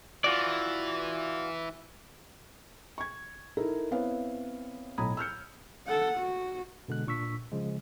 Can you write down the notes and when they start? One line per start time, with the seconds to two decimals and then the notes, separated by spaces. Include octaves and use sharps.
0.24 E3 F4 F#4 D5
2.98 C#6 G#6
3.57 D#4 E4 A4 A#4
3.91 B3 C4 E4 B4 C#5 F5
4.98 B1 A2 A#5 B5 D#6 G#6
5.17 E6 F6 G6 C#7
5.87 A4 F#5
6.18 F#4
6.88 B2 D3 G#3 F#6
7.07 A#2 D4 C#6 E6 B6
7.52 C#3 F3 G#3